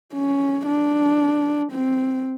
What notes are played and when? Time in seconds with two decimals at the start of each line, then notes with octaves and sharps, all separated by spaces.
0.13 C#4
0.67 D4
1.72 C4